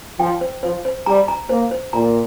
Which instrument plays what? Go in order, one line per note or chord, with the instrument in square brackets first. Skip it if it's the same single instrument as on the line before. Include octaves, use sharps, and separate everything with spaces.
[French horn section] F3 [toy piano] G5
[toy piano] C5
[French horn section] F3 [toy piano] C5
[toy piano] C5
[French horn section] G3 [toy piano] A#5
[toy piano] A#5
[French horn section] A#3 [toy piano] C5
[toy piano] C5
[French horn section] A#2 [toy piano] A#5